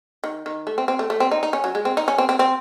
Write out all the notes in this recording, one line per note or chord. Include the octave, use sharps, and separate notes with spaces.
D#3
D#3
A3
C4
C4
A3
A3
C4
D#4
D#4
C#4
F#3
G#3
C4
D#4
C#4
C4
C4
C4